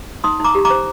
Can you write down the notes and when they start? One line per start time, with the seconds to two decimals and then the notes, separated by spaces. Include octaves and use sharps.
0.24 D#4 C6 D#6
0.40 D#4 A#5 D6
0.55 G4
0.65 A#5 D6
0.70 C5